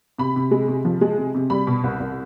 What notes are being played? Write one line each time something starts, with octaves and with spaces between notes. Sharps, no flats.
C3 B5
C3
G#3
C3
F3
G#3
C3
C3
G3 B5
B2
C2
C2